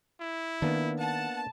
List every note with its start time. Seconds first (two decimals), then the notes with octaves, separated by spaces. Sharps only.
0.20 E4
0.62 D#3 A#3 B3 D4
1.00 F#5 A5